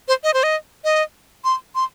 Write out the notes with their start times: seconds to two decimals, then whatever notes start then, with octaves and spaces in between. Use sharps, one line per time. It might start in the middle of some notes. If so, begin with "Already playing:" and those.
0.08 C5
0.24 D#5
0.34 C5
0.43 D#5
0.84 D#5
1.44 C6
1.75 C6